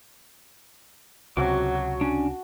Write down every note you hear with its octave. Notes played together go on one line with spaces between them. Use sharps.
C#2 C3 F#3 F#4 A5 D6
C#4 D4